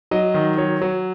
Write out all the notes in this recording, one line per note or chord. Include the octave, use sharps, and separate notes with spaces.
F#3 D#5
D#3
F#3 C#5
F#3